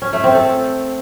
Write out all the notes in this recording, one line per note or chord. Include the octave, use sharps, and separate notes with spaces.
C#4
A3
C4
A4